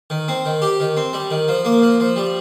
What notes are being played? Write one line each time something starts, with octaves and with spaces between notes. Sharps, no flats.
D#3
C4
D#3
G4
D#3
C4
G3
D#3
F3
A#3
F3
F3
G3